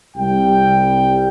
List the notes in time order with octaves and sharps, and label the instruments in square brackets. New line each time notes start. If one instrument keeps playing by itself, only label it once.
[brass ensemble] C2 C3 G3 G5